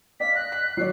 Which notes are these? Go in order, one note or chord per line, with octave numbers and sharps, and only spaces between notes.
D5 D#5 F5 B6
F#6 A#6
B6
F#3 C#5 D5 C7